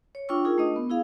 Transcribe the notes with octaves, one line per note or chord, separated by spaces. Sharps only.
C#5
D4 F4 G5 C#6 E6
D#4 F4 G#4 A#4
A3 D4 D#5 D#6
B3
E4 G#4 F5